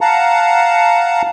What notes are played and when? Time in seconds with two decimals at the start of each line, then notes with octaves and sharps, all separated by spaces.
0.01 F5 F#5 A5 A#5